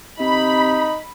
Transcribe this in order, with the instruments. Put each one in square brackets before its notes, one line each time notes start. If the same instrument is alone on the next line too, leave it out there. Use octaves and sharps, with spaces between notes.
[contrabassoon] C3 [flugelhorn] D#4 [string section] B5